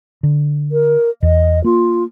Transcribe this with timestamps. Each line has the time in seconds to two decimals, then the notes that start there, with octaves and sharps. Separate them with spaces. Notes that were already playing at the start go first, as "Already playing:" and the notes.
0.23 D3
0.72 A#4
1.23 E2 D#5
1.64 A#3 F4